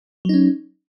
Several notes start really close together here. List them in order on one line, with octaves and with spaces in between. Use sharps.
F#3 D#4 C#4